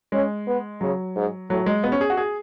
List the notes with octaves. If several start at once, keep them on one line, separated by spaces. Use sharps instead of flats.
G#3 C#4
B3
C#3 F#3
G#2
A2 F#3
G#3
B2 B3
C#4
G#4
F#4
G#4